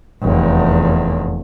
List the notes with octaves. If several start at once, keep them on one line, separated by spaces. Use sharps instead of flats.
F1 E2